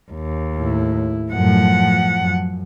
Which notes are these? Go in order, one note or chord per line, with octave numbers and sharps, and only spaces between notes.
D#2
A2 E4
F#2 A2 F3 F#5
F#2